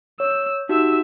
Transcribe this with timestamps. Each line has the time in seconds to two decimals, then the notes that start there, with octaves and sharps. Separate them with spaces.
0.20 C#5 E6
0.69 D#4 F#4 G4 E5 E6